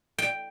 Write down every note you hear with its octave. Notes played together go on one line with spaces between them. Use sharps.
G5